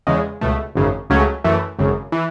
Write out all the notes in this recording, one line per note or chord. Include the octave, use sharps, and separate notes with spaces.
E2 C#3 G#3
C#2 B2 A3
G#1 F#2 C#3
C#2 C#3 F#3 A3 C#4
F#2 E3 A3
G#1 F#2 C#3
E3